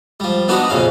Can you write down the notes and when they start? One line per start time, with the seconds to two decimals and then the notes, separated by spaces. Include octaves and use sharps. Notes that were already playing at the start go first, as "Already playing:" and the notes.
0.20 F3 G3
0.48 B3 D4 D#4 F#4 G4 B4
0.69 A#1 F2 C#3 C#4 F5